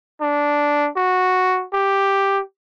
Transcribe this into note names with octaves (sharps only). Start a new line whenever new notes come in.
D4
F#4
G4